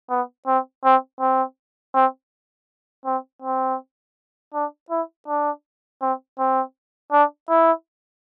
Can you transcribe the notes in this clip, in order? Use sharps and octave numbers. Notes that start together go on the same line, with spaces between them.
B3
C4
C4
C4
C4
C4
C4
D4
E4
D4
C4
C4
D4
E4